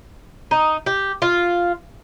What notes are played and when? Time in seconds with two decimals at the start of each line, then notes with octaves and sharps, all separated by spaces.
0.51 D#4
0.86 G4
1.22 F4